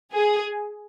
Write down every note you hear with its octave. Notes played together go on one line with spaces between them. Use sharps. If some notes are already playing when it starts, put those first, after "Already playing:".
G#4